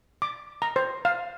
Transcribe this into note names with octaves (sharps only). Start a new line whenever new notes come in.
D6
A#5
C5
F5